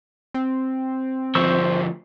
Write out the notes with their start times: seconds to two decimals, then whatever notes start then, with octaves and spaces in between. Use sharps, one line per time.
0.34 C4
1.35 D2 F3 C5 C#6 E6